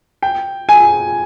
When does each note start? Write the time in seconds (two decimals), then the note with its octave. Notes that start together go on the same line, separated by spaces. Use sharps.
0.22 G5
0.69 G#5